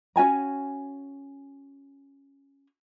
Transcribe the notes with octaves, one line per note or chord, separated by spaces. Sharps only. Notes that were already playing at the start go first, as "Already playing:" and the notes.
C#4 F#4 G#5 A#5